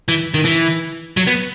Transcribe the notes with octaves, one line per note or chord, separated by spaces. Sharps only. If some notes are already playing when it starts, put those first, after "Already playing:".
E3
D#3
E3
F#3
B3